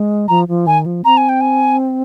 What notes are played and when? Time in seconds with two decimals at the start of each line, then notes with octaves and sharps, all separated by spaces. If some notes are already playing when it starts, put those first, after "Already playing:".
Already playing: G#3
0.28 F3 A#5
0.48 F3
0.67 D#3 G#5
0.86 F3
1.05 C4 A#5
1.17 G#5
1.29 G5
1.41 G#5